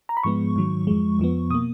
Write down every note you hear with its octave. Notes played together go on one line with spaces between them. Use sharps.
A#5
B5
G#2 F3 G#3 B3 C#6
G#2 D#3 F#3
F2 F3 G#3
F2 F3 B3
B2 A#3 D#6